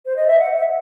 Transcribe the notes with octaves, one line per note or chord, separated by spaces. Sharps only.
C5
D#5
E5
F#5
E5